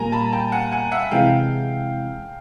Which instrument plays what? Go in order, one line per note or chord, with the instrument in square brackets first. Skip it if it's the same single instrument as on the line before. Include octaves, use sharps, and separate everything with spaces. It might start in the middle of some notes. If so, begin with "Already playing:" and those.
Already playing: [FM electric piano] A#2 G3 A#3 [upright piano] G#5 A#5
[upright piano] A5 B5
G5 A5
F#5 G#5
F#5 G#5
E5 F#5
[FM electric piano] C3 E3 G#3 [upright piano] F5 G5